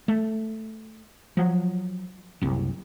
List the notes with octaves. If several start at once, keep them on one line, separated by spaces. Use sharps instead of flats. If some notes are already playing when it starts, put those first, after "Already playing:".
A3
F3 F#3
F#1 C2